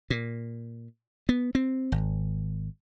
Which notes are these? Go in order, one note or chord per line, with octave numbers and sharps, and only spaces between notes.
A#2
B3
C4
G#1